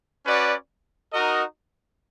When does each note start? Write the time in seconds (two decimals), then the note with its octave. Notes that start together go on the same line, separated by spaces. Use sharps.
0.24 C#4 F#4 B4 D5
1.12 D#4 F#4 A#4 D#5